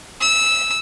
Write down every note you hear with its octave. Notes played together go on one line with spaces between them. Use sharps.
E6